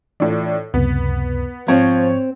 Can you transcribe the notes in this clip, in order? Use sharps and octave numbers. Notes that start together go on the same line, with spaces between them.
A2 E3 D4 F4
C#2 F#2 C3 B3
G#2 F3 C4 C#5